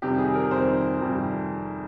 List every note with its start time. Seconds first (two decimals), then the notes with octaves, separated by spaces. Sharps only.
0.02 F2 C3 D#3 G3 G4
0.18 G#4
0.35 A#4
0.51 F2 C3 D#3 G3 C5
1.01 F2 C3 D#3 G3